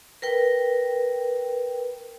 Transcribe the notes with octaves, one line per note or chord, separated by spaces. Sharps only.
A#4 B4 G5